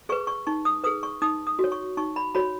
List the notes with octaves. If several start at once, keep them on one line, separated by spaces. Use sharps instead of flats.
G#4 B4 C#6
C#6
D#4 C#6
D#6
G#4 B4 D#6
C#6
D#4 D#6
D#6
F#4
C#5
C#6
D#4 C#6
B5
F#4 C#5 B5